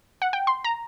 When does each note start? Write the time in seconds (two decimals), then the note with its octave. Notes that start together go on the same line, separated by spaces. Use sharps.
0.22 F#5
0.33 G5
0.47 C6
0.64 A#5